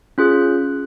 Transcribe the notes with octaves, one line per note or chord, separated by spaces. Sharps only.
C#4 F4 G#4 F#6